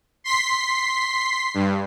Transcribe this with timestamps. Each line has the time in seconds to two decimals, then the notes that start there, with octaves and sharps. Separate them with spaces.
0.24 C6 B6 C7
1.54 G2